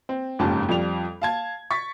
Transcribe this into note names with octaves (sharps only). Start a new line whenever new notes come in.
C4
F#1 F2 G#2 C#4 G4 A5
F2 F3 G3 F7
F5 A5 G#6
C#6 A6 B6